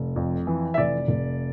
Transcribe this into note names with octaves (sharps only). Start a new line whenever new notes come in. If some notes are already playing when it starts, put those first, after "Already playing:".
Already playing: F1
F2
E3
E5
F1 D5
F1